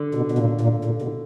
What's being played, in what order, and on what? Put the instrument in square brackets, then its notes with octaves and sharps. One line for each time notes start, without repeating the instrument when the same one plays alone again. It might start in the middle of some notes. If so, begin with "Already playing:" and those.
Already playing: [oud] D3
[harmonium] B2
B2
A#2
A#2
A#2
B2